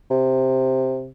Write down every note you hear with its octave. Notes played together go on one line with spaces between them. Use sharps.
C3